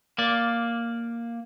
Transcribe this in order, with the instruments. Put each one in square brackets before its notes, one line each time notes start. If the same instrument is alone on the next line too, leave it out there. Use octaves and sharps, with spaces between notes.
[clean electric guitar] A#3 D5